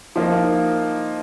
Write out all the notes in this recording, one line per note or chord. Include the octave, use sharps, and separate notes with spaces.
F3 A#3 D#4